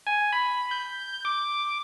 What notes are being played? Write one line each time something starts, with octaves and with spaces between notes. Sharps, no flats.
G#5
B5
G6
D6